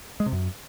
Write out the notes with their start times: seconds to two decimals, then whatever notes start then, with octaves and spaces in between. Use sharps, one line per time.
0.20 G#3
0.26 C3
0.32 F#2